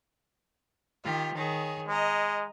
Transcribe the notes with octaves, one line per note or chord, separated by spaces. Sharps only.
D#3 F4 G4
D#3 G#4 C#5
G#3 D#5 A#5